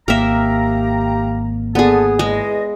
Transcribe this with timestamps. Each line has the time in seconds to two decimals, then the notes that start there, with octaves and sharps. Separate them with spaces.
0.08 G#1 A#3 G4 A#4 E5 F5 A#5
1.75 D3 B3 G#4 A5
2.19 E2 G#3 D#5